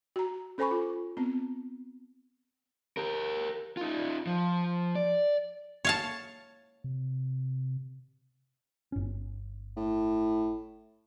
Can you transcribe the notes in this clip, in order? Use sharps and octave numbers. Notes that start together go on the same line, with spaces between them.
F#4 A#5
C#4 A4 C5 G#5 B5 C#6
F4
B3 C4
G4 A#4
D#4 F4
F3
D5
C#5 F5 A5
C3
G1 C#4
A2